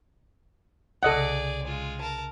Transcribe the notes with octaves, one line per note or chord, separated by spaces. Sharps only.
C2 C#3 G#4 A4 D5 D#5 F#5
G#3 F4
A#4 A5